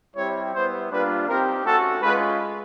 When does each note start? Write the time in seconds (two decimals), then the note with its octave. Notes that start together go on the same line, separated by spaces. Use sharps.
0.15 G3 C4 E4 G4 C#5
0.53 G3 B3 E4 C5
0.90 G3 A#3 D4 F4 B4
1.28 C4 D#4 G4 A#4
1.65 A3 C#4 F#4 A4
2.02 G#3 C#4 F4 B4